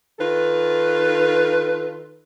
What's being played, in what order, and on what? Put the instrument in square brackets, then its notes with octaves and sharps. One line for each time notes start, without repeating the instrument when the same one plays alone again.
[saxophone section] D#3 F4 A4 B4